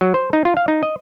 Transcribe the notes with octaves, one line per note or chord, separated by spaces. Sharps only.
F#3
C5
D#4
F4
F5
D#4
D#5